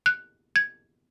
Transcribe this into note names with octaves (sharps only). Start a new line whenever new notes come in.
F#6
G#6